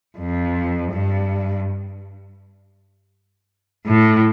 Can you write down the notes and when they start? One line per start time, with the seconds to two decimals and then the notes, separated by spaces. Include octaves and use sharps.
0.18 F2
0.92 G2
3.86 A2